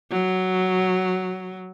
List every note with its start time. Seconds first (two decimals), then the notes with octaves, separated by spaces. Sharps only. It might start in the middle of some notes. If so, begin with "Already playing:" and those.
0.11 F#3